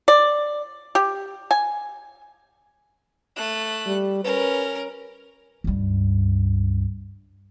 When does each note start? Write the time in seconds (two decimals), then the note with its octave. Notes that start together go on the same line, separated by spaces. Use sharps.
0.08 D5
0.95 G4
1.51 G#5
3.36 A3 F#6
3.86 G3
4.24 C#4 A#4 B4
5.64 C#2 G2